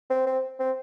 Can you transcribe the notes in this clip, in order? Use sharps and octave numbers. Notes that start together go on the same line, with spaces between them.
C4
C4
C4